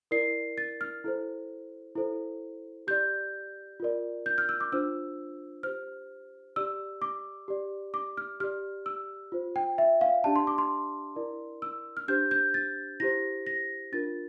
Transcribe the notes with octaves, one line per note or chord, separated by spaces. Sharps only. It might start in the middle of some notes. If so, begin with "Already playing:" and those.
E4 A#4 D5 C7
A6
F6
E4 A4 C5
E4 A4 C5
G4 D5 G6
F4 A#4 D5
G6
F6
E6
D6
D4 F4 C5 E6
G4 C5 F6
G4 D5 E6
D6
G4 D5
D6
F6
G4 D5 F6
E6
F4 C5
G5
E5
F5
D4 G4 D5 A5
C6
D6
C6
E4 A#4 D5
E6
F6
D4 G4 C5 G6
G6
A6
E4 G4 C5 A#6
A#6
D4 F4 A#4 A6